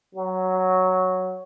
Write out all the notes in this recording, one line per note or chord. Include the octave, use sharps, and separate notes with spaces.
F#3